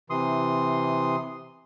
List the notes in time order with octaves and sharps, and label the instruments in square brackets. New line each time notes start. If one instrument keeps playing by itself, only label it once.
[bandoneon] C3 E3 C6 D#6